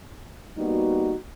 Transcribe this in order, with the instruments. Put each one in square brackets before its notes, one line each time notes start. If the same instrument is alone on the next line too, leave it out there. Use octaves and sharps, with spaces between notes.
[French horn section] G3 A#3 B3 D#4 F#4